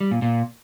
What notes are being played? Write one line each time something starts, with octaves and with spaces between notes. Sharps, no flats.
G3
A#2
A#2